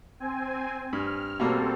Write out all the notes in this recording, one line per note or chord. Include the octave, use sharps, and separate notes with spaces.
C4 G#5
G2 F6
B2 G3 A#3 C4 A4